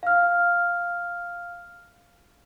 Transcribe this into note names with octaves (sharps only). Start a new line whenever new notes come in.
F5 F6